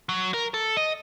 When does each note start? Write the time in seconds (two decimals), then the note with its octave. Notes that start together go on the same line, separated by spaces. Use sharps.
0.09 F#3
0.34 A#4
0.54 A4
0.77 D#5